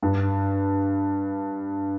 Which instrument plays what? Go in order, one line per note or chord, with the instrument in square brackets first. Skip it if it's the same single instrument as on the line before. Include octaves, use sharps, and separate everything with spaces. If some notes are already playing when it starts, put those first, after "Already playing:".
[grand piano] G2